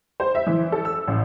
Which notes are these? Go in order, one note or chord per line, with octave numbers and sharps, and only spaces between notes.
C5
E5
E3
A4
E6
A1